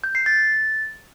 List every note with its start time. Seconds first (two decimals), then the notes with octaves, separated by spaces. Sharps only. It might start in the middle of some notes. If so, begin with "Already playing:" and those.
0.04 G6
0.15 C7
0.26 A6